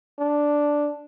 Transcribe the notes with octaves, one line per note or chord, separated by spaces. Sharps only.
D4